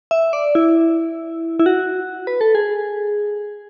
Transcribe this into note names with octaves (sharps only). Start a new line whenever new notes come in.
E5
D5
E4
E4
F#4
B4
A4
G#4